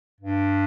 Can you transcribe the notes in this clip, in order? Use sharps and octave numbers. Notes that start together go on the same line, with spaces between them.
G2